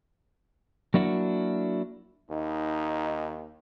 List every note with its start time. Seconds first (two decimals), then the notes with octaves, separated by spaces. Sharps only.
0.94 F#3 A#3 D4 E4 F#4
2.31 D#2 D#4